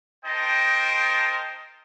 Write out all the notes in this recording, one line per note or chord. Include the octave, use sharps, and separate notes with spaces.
D#4 A#4 C5 D#5 G5 A5